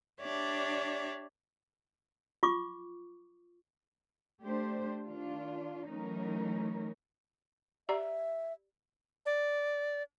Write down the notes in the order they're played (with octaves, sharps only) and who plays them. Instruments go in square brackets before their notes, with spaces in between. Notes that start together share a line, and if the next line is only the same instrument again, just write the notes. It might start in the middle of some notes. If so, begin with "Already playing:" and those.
[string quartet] D4 G4 C#5 D5 E5
[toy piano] F4 C#6 D6
[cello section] A3 D4 G4 C5
D#3 D4 F4
E3 F#3 A3 C#4 D#4 A#4
[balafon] G4 D5 A#5 [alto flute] E5
[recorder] D5